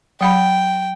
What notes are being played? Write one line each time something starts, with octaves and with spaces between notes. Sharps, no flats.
F#3 F#5 G5 B5